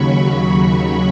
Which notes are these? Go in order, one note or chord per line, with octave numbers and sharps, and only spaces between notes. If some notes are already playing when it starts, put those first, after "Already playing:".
Already playing: D#2 C#3 F#3 B5 C#6